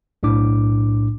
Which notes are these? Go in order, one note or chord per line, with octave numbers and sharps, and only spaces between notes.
B1 A2 D4 D6